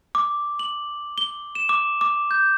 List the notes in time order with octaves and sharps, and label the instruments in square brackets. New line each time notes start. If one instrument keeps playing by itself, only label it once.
[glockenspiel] D6
F#7
G7
E7
D6
D6
G6